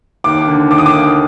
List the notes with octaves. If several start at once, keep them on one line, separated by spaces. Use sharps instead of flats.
D#2 D6
D3
D#2 D6
D#6
D6
D3